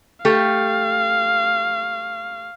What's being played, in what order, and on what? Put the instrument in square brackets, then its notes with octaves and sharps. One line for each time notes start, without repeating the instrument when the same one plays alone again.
[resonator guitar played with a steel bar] A3 G4 [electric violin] F5